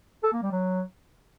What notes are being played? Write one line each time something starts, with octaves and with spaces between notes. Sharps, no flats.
A4
A#3
G3
F#3